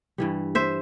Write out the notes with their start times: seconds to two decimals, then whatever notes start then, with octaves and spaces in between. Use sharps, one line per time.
0.18 G2 E3 G3
0.55 C5 E5